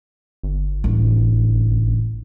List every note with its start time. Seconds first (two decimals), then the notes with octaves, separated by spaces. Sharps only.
0.43 G1
0.84 A1 D4